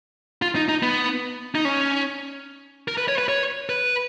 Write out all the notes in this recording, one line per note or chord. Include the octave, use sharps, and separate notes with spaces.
F4
D#4
D#4
B3
D#4
C#4
A#4
B4
C#5
B4
C#5
B4